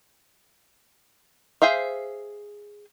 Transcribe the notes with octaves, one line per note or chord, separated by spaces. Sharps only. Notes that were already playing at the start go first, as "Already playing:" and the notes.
G#4 C5 E5 F5